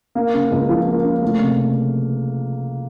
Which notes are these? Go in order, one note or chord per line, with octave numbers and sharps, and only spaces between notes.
A#3
C#3
C#2
F3
A#3
C#3
A3
C3